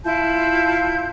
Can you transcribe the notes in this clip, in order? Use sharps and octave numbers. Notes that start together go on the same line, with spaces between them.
E4 F4 A5 G6